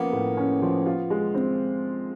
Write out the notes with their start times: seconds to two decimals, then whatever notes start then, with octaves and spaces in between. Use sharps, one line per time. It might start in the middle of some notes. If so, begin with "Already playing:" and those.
Already playing: F3 A#3 B3 C#4
0.12 A2
0.37 C#4
0.62 F3
0.86 F4
1.10 G#3
1.34 C4